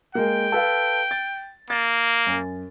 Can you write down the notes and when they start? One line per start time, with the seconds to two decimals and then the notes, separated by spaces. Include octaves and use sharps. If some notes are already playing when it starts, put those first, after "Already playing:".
0.15 G#3 A#3 G5
0.52 A4 B4 F5
1.11 A6
1.70 A#3 A6
2.27 F#2